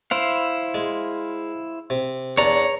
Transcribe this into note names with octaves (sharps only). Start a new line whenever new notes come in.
E4 C5 F5
G#3
C3
E2 D4 C#5 A#5